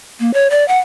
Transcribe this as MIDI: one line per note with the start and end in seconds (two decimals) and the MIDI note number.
0.20 0.33 58
0.34 0.48 73
0.50 0.66 74
0.68 0.78 78